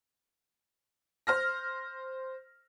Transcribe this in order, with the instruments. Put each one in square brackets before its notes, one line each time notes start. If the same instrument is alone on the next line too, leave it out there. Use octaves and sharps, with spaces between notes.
[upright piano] C5 F6 A#6